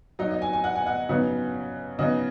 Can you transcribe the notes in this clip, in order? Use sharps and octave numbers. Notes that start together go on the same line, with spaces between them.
F#3 D#4 D#5
D#5
G#5
G#5
F#5
G#5
F#5
C#3 F#3 B3 D#4
C#3 F#3 B3 D#4 D#5